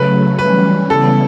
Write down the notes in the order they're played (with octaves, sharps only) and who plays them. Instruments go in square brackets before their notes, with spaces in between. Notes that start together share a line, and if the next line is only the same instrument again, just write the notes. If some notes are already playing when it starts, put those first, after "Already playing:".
Already playing: [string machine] C#3 F#3 A3 [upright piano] B4
[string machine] E3 G3 C#4 [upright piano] B4
[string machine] C#3 G3 B3 E4 [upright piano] A4